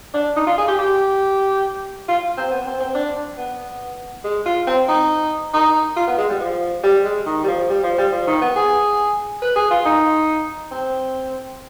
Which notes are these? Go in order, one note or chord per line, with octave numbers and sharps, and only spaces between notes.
D4
D#4
F4
G#4
G4
G4
F4
C4
B3
C4
C4
D4
B3
G#3
F4
C4
D#4
D#4
F4
B3
G#3
G3
F3
G3
G#3
D#3
G3
F3
G3
F3
G3
F3
D#3
B3
G#4
B4
G#4
F4
D#4
C4